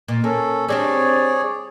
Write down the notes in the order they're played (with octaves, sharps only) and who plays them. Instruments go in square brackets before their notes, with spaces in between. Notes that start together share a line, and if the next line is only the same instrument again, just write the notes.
[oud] A#2
[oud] A#3 [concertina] C#4 A4
[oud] G3 C4 D4 [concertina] G#4 C#5 D5